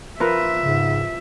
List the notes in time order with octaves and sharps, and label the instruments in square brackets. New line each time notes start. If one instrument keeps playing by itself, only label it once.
[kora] F3 A#4 B4 [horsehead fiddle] E5
[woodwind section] G#2 C#3